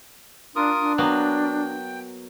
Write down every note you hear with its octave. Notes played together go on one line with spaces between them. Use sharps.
D4 F4 A#4 D#6
D4
F#3 A#3 B3 G5